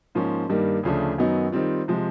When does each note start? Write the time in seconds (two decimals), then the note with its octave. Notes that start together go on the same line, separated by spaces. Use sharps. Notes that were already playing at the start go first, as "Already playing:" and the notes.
0.15 G#2 F3 A#3 C#4
0.49 G2 D#3 G3 A#3
0.83 D2 C#3 F3 A3 D4
1.18 F#2 D#3 F#3 B3 D#4
1.52 D#3 G3 C4 F4
1.88 C3 F3 G#3